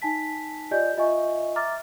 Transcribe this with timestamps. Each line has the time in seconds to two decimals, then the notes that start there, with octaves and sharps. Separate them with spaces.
0.02 D#4 G#5 A5 B6
0.71 F4 G4 D5 D#5 G#5 G6
0.97 F4 D#5 E5 G#5 C#6
1.56 E5 A#5 D6 F6 A6